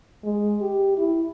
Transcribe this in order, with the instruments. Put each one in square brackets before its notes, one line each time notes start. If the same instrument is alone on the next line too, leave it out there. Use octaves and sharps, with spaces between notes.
[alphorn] G#3
G4
E4